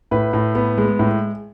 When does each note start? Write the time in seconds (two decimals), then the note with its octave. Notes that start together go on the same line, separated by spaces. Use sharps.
0.11 A2 B4
0.33 A2
0.55 B3
0.78 G#3
0.99 A2